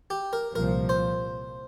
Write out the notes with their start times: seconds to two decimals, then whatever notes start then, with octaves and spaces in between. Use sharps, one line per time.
0.10 G4
0.33 A#4
0.55 C2 A#2 F3 A#4
0.89 C5